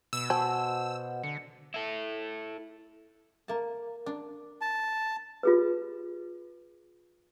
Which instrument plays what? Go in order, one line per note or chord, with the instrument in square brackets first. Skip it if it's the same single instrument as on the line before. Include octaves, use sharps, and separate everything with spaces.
[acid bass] B2 [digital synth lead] E6
[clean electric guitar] F#4 C5 G#5 [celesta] A5
[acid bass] D3 [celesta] C#7
[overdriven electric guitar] E4 A4
[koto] A#3 A5
D4
[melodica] A5
[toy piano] F4 G#4 B4